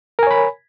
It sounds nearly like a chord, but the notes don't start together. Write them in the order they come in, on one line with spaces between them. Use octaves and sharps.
A#4 G#5 C#5 B5